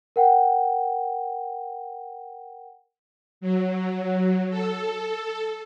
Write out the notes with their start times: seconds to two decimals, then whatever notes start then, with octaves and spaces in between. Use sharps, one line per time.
0.16 A#4 F#5 G5
3.41 F#3
4.50 A4